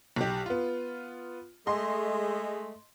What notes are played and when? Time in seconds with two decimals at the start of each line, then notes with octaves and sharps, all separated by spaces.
0.16 B1 G4
0.46 B3 F4
1.67 G#3 A3 D#5 C6